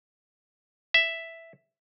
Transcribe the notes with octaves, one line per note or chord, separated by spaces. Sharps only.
E5